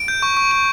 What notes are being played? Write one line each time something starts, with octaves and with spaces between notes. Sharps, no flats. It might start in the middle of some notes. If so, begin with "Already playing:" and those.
Already playing: D7
G6
C#6
C#6
C#6